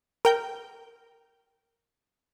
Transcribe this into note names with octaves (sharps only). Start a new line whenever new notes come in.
A#4 G5 G6